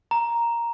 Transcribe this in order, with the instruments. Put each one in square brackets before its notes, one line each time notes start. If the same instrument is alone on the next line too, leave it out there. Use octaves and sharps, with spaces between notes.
[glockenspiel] A#5